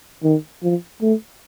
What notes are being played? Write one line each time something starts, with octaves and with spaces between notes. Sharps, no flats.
D#3
F3
A3